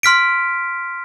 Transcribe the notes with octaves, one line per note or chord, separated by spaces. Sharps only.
C6 F6 B6 D7